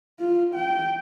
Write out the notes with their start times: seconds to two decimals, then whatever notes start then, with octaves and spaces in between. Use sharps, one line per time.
0.20 F4
0.55 G5